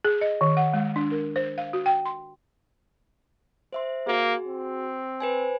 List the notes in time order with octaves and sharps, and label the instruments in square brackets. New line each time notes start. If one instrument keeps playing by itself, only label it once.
[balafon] G#4
D#5
D#3
F#5
G#3
D4
A#4
C5
F5
F#4
G5
C6
[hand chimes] C5 E5 C6
[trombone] A#3 [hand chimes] F#4 G#4
[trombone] C4
[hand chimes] B4 C5 G#5